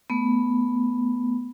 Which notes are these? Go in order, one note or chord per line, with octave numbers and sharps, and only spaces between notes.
A3 B3